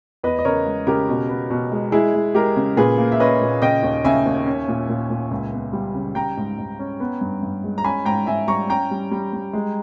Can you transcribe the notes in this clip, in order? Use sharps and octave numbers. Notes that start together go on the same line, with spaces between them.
E2 B4 D#5
D#5
C#3 A#4 C#5
G#3
C#3 G4 A#4
B2
B3
B2
G#3
G#3 E4 G#4
G#3
G#3 G4 A#4
C#3
A#2 G#4 B4
A#3
E5
C#4 B4 D#5
A#2
C#3 D#5 G5
D#2
C#3 E5 G#5
D#2
C#4
A#2
A#2
A#2
C#2
B3
G3
C#3
G3 G5 A#5
G#2
G#2
C#4
B3
G2
G2
G#3
A#5
C#4 G#5 B5
G#2 G5 A#5
G#2 E5 G#5
G3 A#5 C#6
C#4 G5 A#5
G3
G3
G3
G#3